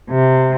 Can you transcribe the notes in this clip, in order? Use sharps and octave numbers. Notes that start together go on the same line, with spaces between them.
C3